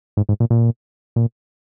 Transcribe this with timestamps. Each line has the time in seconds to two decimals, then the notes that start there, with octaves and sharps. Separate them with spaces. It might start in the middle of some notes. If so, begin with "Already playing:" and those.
0.17 G#2
0.29 G#2
0.40 A#2
0.50 A#2
1.16 A#2